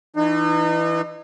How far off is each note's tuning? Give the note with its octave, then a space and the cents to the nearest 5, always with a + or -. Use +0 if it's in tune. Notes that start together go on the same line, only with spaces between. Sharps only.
E3 +0 D#4 -35